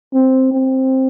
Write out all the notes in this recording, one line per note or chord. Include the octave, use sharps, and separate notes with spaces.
C4
C4